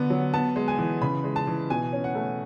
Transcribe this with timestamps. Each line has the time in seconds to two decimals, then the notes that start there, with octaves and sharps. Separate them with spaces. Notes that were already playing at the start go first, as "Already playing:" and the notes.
Already playing: D3 B3
0.10 F#3
0.34 B3 A5
0.56 G#3
0.68 G#5
0.78 E3
1.01 C#3 B5
1.24 G#3
1.36 A5
1.47 E3
1.70 B2 G#5
1.93 C#4
2.04 F#5
2.15 A3